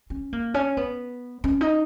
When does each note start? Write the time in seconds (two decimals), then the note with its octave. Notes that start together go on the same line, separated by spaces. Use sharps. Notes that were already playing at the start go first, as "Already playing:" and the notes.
0.10 C#4
0.33 A#3
0.54 C#4
0.77 B3
1.44 C#4
1.61 D#4